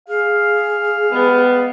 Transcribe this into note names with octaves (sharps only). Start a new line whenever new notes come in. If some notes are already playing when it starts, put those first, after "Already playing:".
G#4 F5
G3 G#3 B3